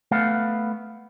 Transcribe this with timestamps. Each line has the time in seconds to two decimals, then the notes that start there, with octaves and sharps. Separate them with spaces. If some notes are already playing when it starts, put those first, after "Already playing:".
0.11 A3 B3 F5